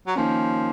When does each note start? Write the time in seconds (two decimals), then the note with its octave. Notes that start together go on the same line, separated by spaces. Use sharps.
0.07 F#3
0.15 D#3 F3 A#3 C#4